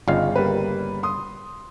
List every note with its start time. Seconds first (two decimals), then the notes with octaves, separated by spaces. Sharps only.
0.08 G1 C#3 D#4 F4 F5
0.36 G3 A#3 B4
1.03 C6 D#6